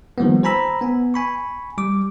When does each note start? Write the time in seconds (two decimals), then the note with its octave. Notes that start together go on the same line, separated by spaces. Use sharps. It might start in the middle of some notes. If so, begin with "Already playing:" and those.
0.18 D#3 F3 G3 A#3 B3
0.43 C5 G#5 A#5 B5 E6
0.81 B3 G#5
1.14 G#5 B5 C#6
1.78 G3 D6